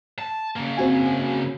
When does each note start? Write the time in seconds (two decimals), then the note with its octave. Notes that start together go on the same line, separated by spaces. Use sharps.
0.19 A5
0.56 C#3 A#3
0.77 C4 F#4 G#5